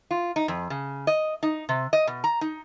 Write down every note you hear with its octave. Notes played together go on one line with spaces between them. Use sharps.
F4
D#4
F2
C#3
D#5
D#4
C3
D#5
B2
A#5
D#4